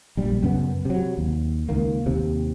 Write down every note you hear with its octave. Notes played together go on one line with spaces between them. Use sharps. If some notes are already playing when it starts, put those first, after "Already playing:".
A#1 G3
F#2 C#3 B3
C3 F#3
D#2
C#2 D#3 A#3
D#2 C3